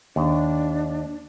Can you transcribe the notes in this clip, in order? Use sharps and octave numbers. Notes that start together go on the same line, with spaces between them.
D#2 D4